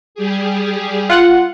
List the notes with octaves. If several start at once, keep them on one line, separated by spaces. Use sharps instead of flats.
G3 G4 G#4
F4 F#5